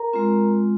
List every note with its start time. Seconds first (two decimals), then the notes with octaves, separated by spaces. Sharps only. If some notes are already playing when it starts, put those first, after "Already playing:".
Already playing: A#4 A#5
0.13 G#3 C4 F4